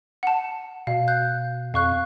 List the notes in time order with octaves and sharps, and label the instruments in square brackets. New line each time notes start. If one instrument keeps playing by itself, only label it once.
[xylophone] F#5 A5
[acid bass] B2 [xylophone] F5
[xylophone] F#6 G6
[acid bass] F2 [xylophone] F5 C#6 F#6